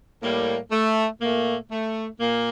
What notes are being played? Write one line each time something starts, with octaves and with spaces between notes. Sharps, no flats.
A2 G3 A#3
A3
A#2 A3 A#3
A3
A#2 A#3